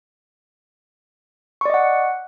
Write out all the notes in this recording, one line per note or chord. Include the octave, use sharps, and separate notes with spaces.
D5 D#5 F#5 C#6